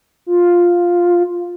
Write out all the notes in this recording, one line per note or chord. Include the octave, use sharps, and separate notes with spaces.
F4